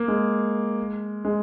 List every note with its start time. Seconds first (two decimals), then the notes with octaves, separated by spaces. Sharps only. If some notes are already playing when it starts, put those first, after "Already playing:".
Already playing: A#3
0.08 G#3
1.25 G#3